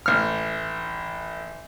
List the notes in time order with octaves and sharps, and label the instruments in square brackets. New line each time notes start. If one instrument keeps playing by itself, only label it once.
[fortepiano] A1 F6